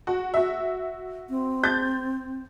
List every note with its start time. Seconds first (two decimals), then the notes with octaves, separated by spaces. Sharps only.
0.07 F#4
0.34 F#4 E5
1.30 C4
1.64 G6 A6